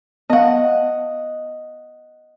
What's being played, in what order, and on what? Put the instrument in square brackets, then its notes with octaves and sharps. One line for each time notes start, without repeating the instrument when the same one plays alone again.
[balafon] B3 F5 [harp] D#5 F#5